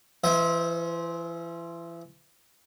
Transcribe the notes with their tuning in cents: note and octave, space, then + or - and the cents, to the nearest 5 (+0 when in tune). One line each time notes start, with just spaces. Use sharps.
E3 +35 C5 +0 E5 -35